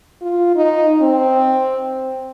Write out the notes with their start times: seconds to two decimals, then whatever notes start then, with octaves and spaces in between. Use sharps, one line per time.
0.22 F4
0.56 D#4
1.01 C4